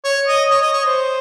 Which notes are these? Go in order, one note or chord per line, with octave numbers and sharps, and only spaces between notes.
C#5
D#5
C#5
D#5
C#5
C5